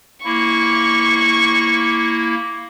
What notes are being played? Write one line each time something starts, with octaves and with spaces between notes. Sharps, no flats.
A#3 E4 C#6